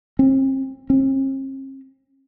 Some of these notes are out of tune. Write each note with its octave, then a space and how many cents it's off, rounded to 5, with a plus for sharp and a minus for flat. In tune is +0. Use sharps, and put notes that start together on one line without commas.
C4 +40
C4 +45